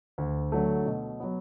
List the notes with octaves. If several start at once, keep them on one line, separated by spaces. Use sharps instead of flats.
D2
D3 F#3 A3
B2
F#3 B3